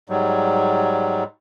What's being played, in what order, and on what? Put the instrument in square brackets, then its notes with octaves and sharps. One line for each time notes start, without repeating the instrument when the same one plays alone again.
[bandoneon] G#2 F#3 G3